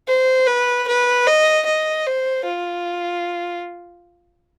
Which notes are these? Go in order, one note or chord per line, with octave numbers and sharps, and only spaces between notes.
C5
B4
B4
D#5
D#5
C5
F4